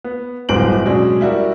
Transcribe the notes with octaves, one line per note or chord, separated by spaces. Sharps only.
B3
D1 G1 G#3 C5 D7 F#7
B2 F#3 G#3 C#4 D4
G3 E4 F#4 A#4